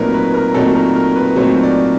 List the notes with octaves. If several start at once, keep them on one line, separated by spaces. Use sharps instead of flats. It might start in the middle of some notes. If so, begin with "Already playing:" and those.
Already playing: A#2 F#3 A3 C4 D#4 A#4 B4
B4
A#4
A#2 F#3 A3 C4 D#4 A4
A#4
A#4
B4
A#2 F#3 A3 C4 D#4 C5
D5